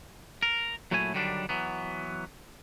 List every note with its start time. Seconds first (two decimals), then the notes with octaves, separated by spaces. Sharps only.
0.43 A#4
0.91 A#2 F#3 A3 E4 C#5 G#5
1.14 D3 D#3 F#3 G3 C4 D4
1.49 E3 F#3 B3